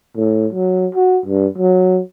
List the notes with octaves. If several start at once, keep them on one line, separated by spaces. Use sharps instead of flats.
A2
F#3
F#4
G2
F#3